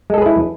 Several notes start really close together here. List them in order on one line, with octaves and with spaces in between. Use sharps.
G#3 A4 G#4 B4 E4